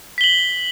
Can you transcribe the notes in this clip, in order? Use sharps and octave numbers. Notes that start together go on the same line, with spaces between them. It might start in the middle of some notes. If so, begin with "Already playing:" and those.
B6 F#7 G7